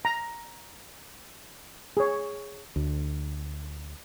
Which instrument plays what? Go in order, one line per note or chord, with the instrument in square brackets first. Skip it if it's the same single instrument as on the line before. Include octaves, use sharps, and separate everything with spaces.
[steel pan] A#5
G#4 C#5
[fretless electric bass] D2